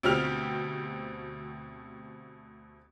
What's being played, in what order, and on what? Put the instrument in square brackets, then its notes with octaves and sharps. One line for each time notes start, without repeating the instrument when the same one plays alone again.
[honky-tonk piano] D2 B2 C4 G4 F6 F7